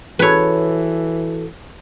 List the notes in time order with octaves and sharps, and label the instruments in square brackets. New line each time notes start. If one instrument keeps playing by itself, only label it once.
[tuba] E3 [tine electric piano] F#4 A4 [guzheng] B4 C#5